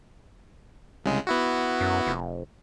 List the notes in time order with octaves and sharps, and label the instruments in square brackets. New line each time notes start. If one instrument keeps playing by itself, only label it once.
[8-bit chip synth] C2 C#3 G#3
B3 E4 F#4
[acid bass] F#2
F1